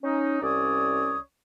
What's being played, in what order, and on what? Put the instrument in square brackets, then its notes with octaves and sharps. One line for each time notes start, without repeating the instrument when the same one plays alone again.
[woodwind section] C#4 D#4
C2 C#4 C#5 D5 D#6